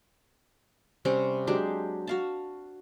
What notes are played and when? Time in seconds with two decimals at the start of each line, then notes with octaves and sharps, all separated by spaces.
1.05 C3 G3 C4 C#4
1.47 F#3 G#3 D4 G4
2.07 F#4 F5 A5